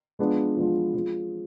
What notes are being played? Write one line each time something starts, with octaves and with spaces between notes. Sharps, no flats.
F3 G#3 B3 D4 F4
F3 G#3 B3 D4 F4
F3 G#3 C4 F4